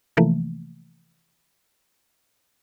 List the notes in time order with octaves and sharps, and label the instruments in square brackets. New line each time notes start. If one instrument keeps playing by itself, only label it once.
[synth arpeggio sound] C3 E3 F3 A3 A#3